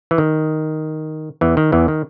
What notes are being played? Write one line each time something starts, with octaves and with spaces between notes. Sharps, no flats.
E3
D#3
E2 E3
D#3
E2 E3
D#3